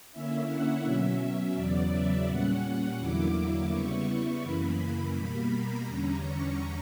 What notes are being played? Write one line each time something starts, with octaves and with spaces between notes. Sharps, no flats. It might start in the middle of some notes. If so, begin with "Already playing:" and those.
D3 A#3 C#4 E4 E5
F#5
B2 F#3 C#4 E5
E2 C#3 F#3 B3 D5
E5
A#2 G3 C#4 F#5
E2 D3 F#3 A#3 E4 D6
D6
C#3 G3 B3 E4 C#6
C#6
F#2 C#3 E3 A#3 B5
B2 G3 A#3 B5
A#5
E2 D3 G3 C#4
C#6